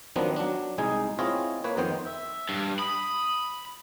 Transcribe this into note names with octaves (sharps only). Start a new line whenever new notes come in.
D#3 F3 F#3 B3 C4 D4
F#3 D4
C2 G#3 D#4 G#4 G#5
C4 E4 F4 G#4 C#5 D#5
A#3 B4 C#5
F2 D#3 B3 C5 G5
E5
G2
B5 D#6